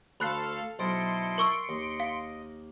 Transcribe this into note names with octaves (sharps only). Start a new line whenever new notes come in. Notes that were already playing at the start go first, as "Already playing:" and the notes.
D2 A4 C5 F5 B5 F#6 C7
B1 E4 C5 D#5 A5 C6 C#7 D7
A#4 C#6 E6
D#2 D#5
F5